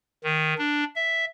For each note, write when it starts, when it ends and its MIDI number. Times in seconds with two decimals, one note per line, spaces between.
0.24 0.54 51
0.58 0.84 62
0.96 1.25 76